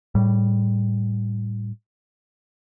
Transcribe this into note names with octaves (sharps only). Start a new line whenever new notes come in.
A2 G3